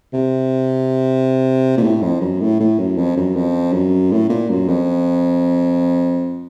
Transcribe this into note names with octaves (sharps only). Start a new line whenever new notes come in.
C3
A#2
A2
F2
F#2
A2
A2
F#2
F2
F#2
F2
F#2
A2
A#2
F#2
F2